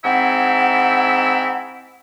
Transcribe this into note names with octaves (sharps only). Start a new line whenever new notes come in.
G#2 C4 E4 E5 F#5